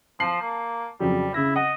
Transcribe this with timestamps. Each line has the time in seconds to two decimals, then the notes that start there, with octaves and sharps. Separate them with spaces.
0.20 F3 A5 C7 F#7
0.42 A#3
1.00 F2 C#3 F#3 G3
1.34 C#3 E4 A#6
1.56 D#5 F#5